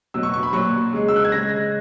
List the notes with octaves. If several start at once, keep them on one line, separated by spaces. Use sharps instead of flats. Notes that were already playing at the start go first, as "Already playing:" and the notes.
B2 F#3 E6
C#6
C#6
B5
A#2 F#3 C#6
C#3 G#3
E6
F#6
G#6
C#3 G#3 A#6